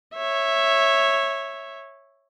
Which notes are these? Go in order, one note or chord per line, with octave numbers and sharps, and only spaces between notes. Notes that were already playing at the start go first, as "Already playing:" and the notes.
C#5 E5